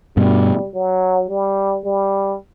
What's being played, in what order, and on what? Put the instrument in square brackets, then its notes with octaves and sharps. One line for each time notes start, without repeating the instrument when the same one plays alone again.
[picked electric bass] G2 B2 [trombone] G3
[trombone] F#3
G3
G3